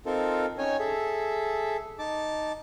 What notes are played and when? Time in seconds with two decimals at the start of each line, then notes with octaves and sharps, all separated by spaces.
0.06 C4 D#4 F4 A4 A#4
0.58 C#4 D#4 C#5 G5 G#5
0.79 G#4 A4 E5
1.99 D#4 A5 D6